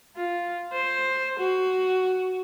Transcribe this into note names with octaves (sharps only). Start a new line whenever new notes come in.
F4
C5
F#4